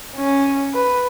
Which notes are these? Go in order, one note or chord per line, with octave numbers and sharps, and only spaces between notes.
C#4
B4